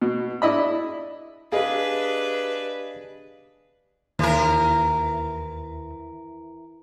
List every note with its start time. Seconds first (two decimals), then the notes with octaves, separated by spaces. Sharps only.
0.02 B2
0.42 D4 E4 D#5 B5
1.52 D4 G4 G#4 B4 D#5 F5
4.19 D#2 E3 A#4